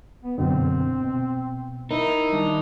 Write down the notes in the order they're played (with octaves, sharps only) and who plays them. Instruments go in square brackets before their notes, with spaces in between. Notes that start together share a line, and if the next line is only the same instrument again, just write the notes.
[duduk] B3
[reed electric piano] F#2 B2 D3 [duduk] C4
[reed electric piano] B2
[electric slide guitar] D#4 [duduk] E4 [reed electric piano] A#4
[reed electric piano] D#3 G3 [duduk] D4